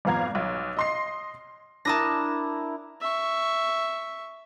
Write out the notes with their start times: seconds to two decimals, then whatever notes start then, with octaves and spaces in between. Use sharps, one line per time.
0.05 G#1 F2 B3 F5 A#5 G#6
0.35 B1
0.77 D#5 C6 C7
1.85 D4 E4 A#4 A5 D#6 A#6
3.00 E5 C#6